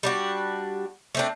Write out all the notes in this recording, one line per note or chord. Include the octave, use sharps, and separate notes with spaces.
G3 D4 F#4
A3 C4 D4